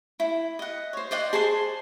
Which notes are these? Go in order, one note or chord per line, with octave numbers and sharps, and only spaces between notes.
E4
D#5 F#5
C5 C#5
C5 D5 D#5 F#5
G#4 C5 A5 C6